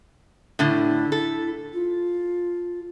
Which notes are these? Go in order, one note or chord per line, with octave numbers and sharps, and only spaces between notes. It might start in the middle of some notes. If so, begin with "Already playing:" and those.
A2 D3 E4
A4
F4